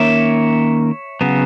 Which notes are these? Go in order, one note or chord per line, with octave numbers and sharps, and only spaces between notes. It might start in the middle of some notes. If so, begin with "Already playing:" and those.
Already playing: D#3 A#3 C#4 C#5 E5
C#3 F#3 B3